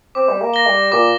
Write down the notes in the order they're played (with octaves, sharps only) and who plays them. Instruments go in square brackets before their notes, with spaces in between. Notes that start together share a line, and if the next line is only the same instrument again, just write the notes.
[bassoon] C4 [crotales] D6
[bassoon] G3
A#3
[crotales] A#6 G7
[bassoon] G3
[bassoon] A#2 [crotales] D6